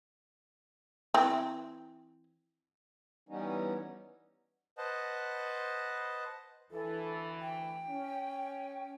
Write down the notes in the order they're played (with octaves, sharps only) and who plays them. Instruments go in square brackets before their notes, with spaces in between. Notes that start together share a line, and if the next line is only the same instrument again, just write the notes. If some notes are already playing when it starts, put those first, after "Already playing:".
[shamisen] E3 C4
[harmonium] E3 G3 B3 C#4 D#4
[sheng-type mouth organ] B4 C5 D#5 F#5 A5
[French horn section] D2 E3 [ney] A4
[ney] G5
[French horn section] C#4